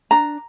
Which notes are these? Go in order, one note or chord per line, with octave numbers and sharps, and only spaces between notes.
D4 A#5